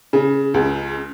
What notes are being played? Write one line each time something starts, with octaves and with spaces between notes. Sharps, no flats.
C#3
C#2